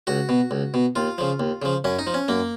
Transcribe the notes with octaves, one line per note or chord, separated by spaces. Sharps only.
C#2 F#4
B2
C#2
B2
D#2 F4
C#3 F3
D#2
C#3 F3
F#2 C#4
D#4
F3
C#4
F#2 A#3